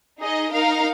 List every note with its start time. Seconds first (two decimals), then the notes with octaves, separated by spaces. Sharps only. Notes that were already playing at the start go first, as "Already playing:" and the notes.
0.19 D#4 G#4 D#5
0.51 D#4 A#4 F5